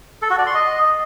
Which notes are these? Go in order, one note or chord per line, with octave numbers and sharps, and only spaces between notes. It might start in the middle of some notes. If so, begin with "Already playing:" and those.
A4
F#4
D5
C6
D#5